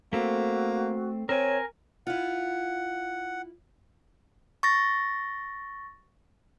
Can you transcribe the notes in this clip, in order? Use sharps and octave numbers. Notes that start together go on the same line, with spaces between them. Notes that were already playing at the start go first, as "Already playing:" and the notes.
A3 A#3 C4 F#4
C4 A#4 C#5 G#5
E4 F4 F#5
C#6 A6 A#6